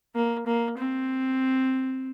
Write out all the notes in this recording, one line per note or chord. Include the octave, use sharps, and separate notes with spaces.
A#3
A#3
C4